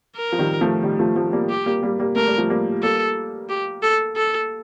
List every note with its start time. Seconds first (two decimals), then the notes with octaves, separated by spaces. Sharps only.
0.17 A#4
0.32 F3
0.38 D#3 G3
0.61 F3 A3
0.83 D#3 G3
0.99 F3 A3
1.16 F3 A3
1.33 G3 A#3
1.50 G4
1.66 G3 A#3
1.83 G3 A#3
1.99 G3 A#3
2.16 A3 A#4
2.27 G3
2.37 F3 A3
2.49 G3 A#3
2.83 G3 A#3 A4
3.49 G4
3.83 A4
4.16 A4